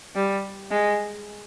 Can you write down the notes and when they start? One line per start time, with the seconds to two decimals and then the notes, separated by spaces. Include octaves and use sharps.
0.15 G3
0.71 G#3